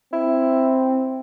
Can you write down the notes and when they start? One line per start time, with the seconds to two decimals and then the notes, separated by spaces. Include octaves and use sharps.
0.13 C4 E4